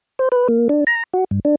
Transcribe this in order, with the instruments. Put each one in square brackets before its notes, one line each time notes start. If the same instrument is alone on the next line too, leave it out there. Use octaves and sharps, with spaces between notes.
[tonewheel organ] C5
B4
A#3
D4
A#5
F#4
G2
D4